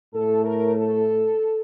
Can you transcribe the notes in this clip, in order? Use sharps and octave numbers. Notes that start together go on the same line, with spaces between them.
A2 A3 A4
A#4
A4